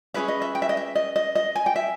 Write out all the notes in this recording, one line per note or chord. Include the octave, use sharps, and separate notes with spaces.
C#4 G#4 B4 E5
D#5
E5
G5
E5
D#5
E5
D#5
D#5
D#5
G#5
G5
E5